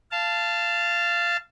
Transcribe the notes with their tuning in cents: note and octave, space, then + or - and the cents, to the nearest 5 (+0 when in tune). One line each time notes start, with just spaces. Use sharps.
F5 -20 A5 +0